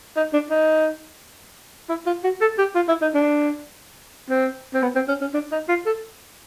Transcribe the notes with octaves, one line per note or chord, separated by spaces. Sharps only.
D#4
D4
D#4
E4
F4
F#4
A4
G4
F4
E4
D#4
D4
C4
C4
B3
C4
C#4
C#4
D4
D#4
F4
A4